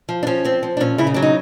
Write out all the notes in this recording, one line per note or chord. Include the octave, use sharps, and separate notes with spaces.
F3
D4
F3 C#4
F3 C4
F3
D4
A#2 C#4
C#3 E4
D#4
F#3 D4
D#4